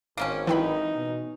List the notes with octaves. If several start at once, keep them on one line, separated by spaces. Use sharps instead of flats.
G#1 A#3 C4 C#4
E3 D#4 G5 B5
B2